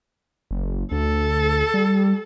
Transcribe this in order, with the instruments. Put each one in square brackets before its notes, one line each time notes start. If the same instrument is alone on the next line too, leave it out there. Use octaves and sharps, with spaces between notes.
[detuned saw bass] F#1
[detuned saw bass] D2 [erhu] A4
[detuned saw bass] G3